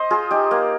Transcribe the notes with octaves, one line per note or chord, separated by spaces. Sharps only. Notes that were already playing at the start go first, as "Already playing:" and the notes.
Already playing: C5 D#5
F4 G#4
D#4 G4
A#3